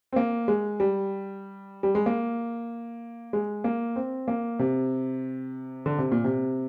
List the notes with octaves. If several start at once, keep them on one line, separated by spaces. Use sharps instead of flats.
C4
A#3
G#3
G3
G3
G#3
A#3
G#3
A#3
C4
A#3
C3
D3
C3
A#2
C3